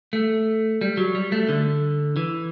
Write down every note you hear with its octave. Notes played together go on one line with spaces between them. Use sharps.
A3
G3
F#3
G3
A3
D3
E3